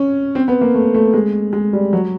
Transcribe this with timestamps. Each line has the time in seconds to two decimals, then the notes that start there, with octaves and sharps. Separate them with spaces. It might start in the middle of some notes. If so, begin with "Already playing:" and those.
Already playing: C#4
0.35 C4
0.48 B3
0.61 A#3
0.75 A3
0.95 A3
1.14 G#3
1.53 G#3
1.73 G3
1.93 F#3